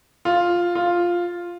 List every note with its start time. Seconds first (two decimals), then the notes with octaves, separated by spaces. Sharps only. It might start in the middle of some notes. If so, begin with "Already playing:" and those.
0.25 F4
0.75 F4